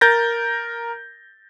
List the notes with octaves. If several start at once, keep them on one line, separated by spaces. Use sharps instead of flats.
A#4 G6 A6 A#6